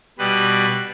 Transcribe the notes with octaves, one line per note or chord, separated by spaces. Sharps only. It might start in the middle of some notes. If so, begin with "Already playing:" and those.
B2 G3 B4